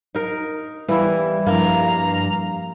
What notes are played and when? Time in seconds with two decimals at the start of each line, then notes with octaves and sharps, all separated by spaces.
0.15 D#4 A#4
0.88 E3 G3 B3 E4 F5
1.46 G2 F3 A#3 E4 F5 A#5